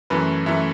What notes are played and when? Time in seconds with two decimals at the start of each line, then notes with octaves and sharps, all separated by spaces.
0.10 F#2 E3 A3 B4
0.46 F#2 E3 A3 E5